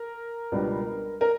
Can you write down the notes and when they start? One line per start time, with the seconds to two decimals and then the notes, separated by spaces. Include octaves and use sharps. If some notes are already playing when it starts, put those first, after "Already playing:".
Already playing: A#4
0.52 C#2 B2 G3 B3 D4
1.21 A#4